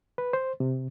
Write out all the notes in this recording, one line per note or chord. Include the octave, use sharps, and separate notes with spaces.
B4
C5
C3